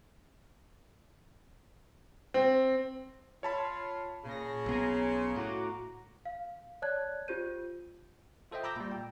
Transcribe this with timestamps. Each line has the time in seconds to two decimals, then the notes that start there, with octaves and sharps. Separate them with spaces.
2.34 C4
3.43 F4 C#5 A5 B5
4.24 A#2 C#3 A#6
4.66 B1 B3 G#5 A#5 C6
5.36 A2 F#4 A#5 D6
6.25 F5
6.82 C#5 D5 A5 F#6 G#6
7.28 F4 G4 C5 G6 D#7
8.51 F4 A4 C5 D#5 E5 G5
8.64 A#5 B5 D6 E6 G6 A#6
8.76 A#2 G3
8.91 G5